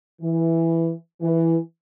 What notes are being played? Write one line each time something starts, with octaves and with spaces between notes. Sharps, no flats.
E3
E3